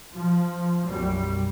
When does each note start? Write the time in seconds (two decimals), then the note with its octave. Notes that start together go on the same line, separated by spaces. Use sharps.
0.12 F3
0.85 B1 F#2 G3